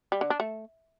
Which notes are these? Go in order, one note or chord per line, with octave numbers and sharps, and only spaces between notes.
G3
D3
D4
A3